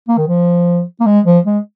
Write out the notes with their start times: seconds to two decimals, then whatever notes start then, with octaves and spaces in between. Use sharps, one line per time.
0.08 A#3
0.17 D#3
0.28 F3
1.00 A#3
1.06 G#3
1.25 F3
1.45 G#3